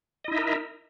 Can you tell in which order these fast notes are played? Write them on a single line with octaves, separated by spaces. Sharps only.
D#5 E4 D#4 E5 A#4